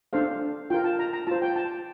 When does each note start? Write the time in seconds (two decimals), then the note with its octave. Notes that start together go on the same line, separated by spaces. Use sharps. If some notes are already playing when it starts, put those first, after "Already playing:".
0.13 D4 A4 C5 F5
0.70 F4 A#4 G5
0.84 A5
0.99 A#5
1.13 A#5
1.27 F4 C5 A5
1.42 G5
1.56 A5